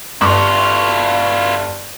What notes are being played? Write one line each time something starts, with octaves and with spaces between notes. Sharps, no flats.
G1 G2 E4 F4 C#6